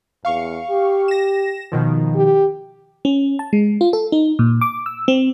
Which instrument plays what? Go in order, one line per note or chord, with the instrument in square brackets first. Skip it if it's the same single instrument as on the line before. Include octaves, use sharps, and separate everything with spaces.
[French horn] E2 [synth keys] F5 C#6
[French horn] G4
[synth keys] A#6 E7
B2 D#3 F3
[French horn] G4
[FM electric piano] C#4
A5
G#3
F4
A4
D#4
A#2
D6
E6
C4